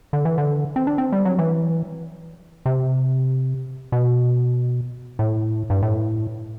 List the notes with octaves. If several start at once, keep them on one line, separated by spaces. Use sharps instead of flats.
D3
E3
D3
C4
D4
C4
G3
F#3
E3
C3
B2
A2
G2
A2